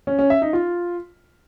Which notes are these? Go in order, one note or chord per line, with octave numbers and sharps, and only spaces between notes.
C#4
C#4
E5
D#4
F4